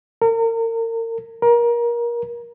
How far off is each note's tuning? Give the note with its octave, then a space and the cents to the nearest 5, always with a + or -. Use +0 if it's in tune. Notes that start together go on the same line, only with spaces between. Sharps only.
A#4 -35
A#4 +25